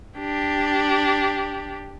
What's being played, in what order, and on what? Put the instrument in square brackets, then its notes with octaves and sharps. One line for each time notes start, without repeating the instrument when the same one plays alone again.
[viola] D4 G4